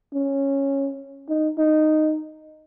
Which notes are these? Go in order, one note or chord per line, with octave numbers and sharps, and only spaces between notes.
C#4
D#4
D#4